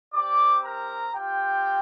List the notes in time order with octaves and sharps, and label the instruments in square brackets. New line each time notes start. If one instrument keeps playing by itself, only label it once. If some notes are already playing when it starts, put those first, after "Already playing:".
[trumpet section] C4 G4 D5 D6
A#4 A#5
C4 F4 G4 G5